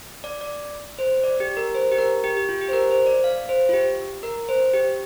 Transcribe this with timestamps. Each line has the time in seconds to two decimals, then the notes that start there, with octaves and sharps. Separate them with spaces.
0.24 D5
0.41 D5
0.99 C5
1.24 D5
1.40 G4
1.57 A#4
1.75 C5
1.92 G4
1.98 A#4
2.24 G4
2.37 G4
2.49 F4
2.61 G4
2.68 C5
2.73 A#4
2.91 C5
3.07 D5
3.24 F5
3.49 C5
3.69 F4
3.73 G4
4.23 A#4
4.49 C5
4.74 G4